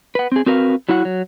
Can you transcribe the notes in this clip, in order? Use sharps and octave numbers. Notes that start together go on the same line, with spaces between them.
B4 F#5
C4 G#4
C4 F#4 A#4 B4 E5 F5
F#3 E4 F#4 F#5
F#3